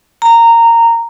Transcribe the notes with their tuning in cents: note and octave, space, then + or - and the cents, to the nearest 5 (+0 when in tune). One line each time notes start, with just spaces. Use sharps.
A#5 -15